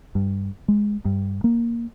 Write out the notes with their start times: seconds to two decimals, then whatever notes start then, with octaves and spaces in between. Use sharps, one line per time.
0.15 G2
0.68 G#3
1.05 G2
1.44 A#3